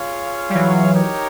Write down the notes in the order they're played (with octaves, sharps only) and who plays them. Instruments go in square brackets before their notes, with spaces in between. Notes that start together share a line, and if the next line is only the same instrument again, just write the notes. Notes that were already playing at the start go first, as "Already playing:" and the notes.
Already playing: [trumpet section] F4 G#4 C#5 F5
[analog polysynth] G3
E3 F#3
[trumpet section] D#4 G4 A#4 C#5